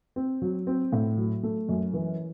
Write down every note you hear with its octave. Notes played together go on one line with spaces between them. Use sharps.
C4
F#3
C4
A2
F#3
A3
F#2
E3